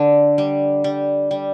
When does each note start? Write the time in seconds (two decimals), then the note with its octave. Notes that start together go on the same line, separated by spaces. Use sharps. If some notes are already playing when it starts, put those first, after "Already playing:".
Already playing: D3
0.38 G3
0.84 G3
1.31 G3